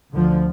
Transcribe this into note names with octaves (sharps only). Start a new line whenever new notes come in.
D2 D3 F3